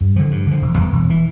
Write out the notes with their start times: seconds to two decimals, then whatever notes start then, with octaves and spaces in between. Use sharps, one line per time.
0.01 G2
0.16 D3 F3
0.31 G2
0.47 D3 F3
0.62 E1
0.78 E2 E3
0.93 E1
1.10 E3